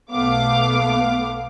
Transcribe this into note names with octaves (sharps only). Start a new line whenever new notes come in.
B1 A3 B3 F5 D6